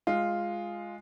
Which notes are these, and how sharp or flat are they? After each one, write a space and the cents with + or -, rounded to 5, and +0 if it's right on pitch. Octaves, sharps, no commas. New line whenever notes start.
G#3 +0 F4 +0